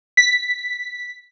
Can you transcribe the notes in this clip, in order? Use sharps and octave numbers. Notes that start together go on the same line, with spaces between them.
B6